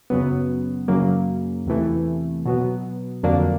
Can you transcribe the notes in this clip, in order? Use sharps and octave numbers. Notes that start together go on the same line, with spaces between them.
F#2 C#3 F#3 B3
F#2 C#3 F#3 A#3
E2 C3 E3 A3
B2 F#3 B3
F2 D3 F#3 A#3 D4